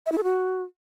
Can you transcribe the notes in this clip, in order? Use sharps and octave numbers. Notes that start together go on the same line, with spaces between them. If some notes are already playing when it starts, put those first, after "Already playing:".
E5
E4
A4
F#4